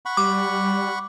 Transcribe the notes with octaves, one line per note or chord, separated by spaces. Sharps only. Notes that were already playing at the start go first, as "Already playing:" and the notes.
F#5 B5 C#6
G3 D6